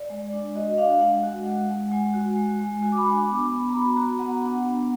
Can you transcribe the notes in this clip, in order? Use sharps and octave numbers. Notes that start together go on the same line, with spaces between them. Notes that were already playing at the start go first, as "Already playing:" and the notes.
Already playing: D5
G#3
D4
F#4 D#5
D4 F5
F5
G#3 F#5
F#4
G#3
G#3
G#3 G#5
F#4
G#3
G#3
F#4 G#5
D6
B5
D4
D6
B3
B3
A#5
F#4 B5
F#4 A#5
B3 F#5
D4
B3